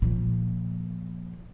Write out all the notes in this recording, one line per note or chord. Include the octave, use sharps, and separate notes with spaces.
A#2 F3